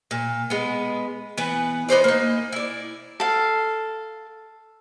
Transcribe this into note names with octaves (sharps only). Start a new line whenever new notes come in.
A#2
G#3 B3
E3 B3 B4
B3 D#4 C5 D5
A#3 D#4
E4 D5
A4 F5